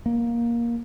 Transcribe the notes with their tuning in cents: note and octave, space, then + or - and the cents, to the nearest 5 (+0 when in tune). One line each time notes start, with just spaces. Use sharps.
A#3 +10